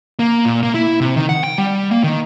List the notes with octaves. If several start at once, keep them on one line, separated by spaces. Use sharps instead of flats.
A#3
A#2
A#3
E4
C3
D#3
F#5
G5
G3
A#3
D#3